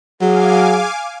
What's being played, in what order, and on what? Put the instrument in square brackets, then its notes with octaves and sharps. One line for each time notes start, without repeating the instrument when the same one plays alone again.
[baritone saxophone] F#3 [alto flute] G#4 [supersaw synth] F5 G#5 D6